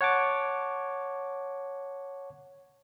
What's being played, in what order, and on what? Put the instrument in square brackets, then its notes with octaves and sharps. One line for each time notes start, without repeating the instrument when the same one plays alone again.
[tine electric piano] C#5 F#5 A5 D6